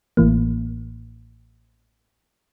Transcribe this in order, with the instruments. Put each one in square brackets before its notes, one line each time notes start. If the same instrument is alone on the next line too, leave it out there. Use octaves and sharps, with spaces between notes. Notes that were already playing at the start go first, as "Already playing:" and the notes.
[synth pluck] A1 A2 E3 A#3